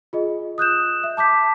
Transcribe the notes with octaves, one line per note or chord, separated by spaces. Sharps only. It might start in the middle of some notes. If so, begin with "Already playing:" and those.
F4 G#4 D#5
D#6 F#6 G6 E7
E5
A5 D6 G6 B6